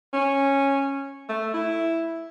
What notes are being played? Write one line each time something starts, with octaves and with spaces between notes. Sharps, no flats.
C#4
A3
E4